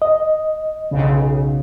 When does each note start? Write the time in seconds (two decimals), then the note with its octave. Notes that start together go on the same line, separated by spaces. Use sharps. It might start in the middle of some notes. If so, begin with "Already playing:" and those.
0.02 D#5
0.91 B1 C#3